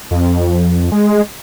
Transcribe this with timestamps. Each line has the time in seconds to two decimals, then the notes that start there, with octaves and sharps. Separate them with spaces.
0.11 F2
0.92 G#3